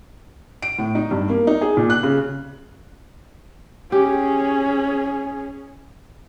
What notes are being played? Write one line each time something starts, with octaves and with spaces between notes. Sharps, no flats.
D7
A2
D#4
G2
A#3
D#4
G#4
A#2
F#6
C#3
C#4 G4 G#4